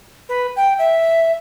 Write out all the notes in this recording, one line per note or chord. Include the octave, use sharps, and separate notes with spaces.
B4
G5
E5